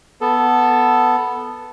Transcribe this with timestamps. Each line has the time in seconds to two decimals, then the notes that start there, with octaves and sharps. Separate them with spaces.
0.21 B3 A4